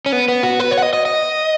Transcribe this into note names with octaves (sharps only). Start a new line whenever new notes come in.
C#4
B3
B3
F#4
B4
C#5
F#5
D#5
D#5
D#5